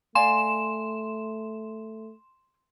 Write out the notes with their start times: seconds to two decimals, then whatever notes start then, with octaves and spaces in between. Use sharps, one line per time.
0.15 A3 D5 F5 G#5 C6 E7